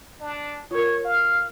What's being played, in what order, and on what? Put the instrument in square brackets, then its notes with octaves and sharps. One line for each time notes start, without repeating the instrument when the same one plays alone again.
[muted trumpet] D4
[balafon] F4 A#4 [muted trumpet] C#5
[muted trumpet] F5